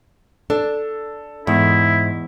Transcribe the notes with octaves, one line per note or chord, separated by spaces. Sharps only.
D4 A4
E2 G#2 E4